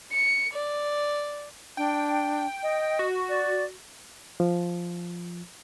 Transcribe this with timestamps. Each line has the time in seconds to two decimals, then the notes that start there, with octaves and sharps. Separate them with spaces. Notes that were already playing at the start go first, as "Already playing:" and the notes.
0.12 C#7
0.53 D5
1.77 D4 G5
2.63 D#5
2.99 F#4
3.29 D5
4.40 F3